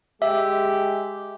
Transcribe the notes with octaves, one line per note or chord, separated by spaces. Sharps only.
G#3 G4 E5